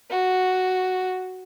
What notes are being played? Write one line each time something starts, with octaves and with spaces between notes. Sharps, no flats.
F#4